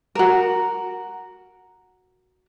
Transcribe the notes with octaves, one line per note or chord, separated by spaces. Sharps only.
F#4 A#4